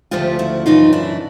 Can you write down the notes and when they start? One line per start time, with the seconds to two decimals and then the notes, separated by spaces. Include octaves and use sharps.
0.11 D2 C#3 F3 A3 F4 G4
0.39 E4 F#4
0.66 F#2 C#3 E3 D#4 F4
0.93 D4 E4